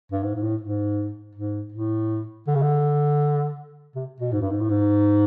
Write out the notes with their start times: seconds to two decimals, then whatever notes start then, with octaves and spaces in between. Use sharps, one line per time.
0.12 G2
0.24 G#2
0.35 G#2
0.42 A2
0.61 G#2
1.35 G#2
1.72 A2
2.47 D3
2.55 C#3
2.62 D3
3.95 C3
4.21 B2
4.32 G#2
4.41 G2
4.51 G#2
4.60 A2
4.70 G#2